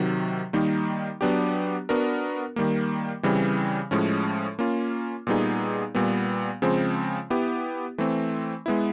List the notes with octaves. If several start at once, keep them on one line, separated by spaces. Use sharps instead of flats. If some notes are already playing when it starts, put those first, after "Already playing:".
Already playing: C3 D#3 F#3
D#3 G3 A#3 D#4
F#3 B3 D4 G4
B3 D4 F#4 A#4
D#3 G3 A#3
C#3 E3 G3 C4
A2 F3 G#3 C#4
A#3 C#4 F4
A#2 G3 B3 D#4 G#4
A#2 G3 B3
C#3 F3 G#3 C4
B3 E4 G4
E3 A3 C4
G#3 B3 E4